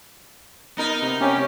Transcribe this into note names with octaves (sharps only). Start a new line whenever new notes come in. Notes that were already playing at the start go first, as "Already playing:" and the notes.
B3 D#4 A#4
C3
C3 C#4 G4